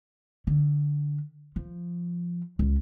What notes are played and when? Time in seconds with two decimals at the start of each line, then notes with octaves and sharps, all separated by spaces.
0.47 D3
1.56 F3
2.59 C#2